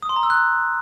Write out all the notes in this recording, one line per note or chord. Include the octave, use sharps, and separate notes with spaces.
D#6
C6
A#5
E6
F#6